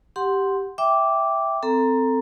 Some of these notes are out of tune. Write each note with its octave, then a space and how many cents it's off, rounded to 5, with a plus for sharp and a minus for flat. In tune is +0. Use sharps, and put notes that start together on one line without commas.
G4 +0 F#5 +0 C6 +0
E5 +0 G5 +0 D6 -10
C4 -15 A4 +15 A#5 +5